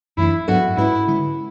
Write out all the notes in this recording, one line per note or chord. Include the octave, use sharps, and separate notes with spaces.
F#2 E3 A3 D4 E4
G#2 F#3 B3 D4 F#4 A4
G#2 G#3 C#4 E4 F#4 B4
D3 G#3 C#4 E4